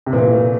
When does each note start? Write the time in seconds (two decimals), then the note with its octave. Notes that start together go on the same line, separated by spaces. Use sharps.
0.06 C3
0.13 A#2 E3
0.32 A3